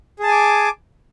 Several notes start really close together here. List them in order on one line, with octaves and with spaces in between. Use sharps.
G#4 A5 G#5 D6